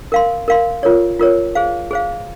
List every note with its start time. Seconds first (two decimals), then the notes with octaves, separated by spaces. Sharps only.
0.12 A#4 F5 C6
0.48 A#4 F5 C6
0.83 F4 A#4 C#5
1.19 F4 A#4 C#5
1.55 G#4 C5 F5
1.91 G#4 C5 F5